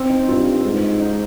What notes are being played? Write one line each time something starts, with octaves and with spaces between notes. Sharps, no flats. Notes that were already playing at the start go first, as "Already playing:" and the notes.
Already playing: C4
D#4
G2 F4
G#2
D#4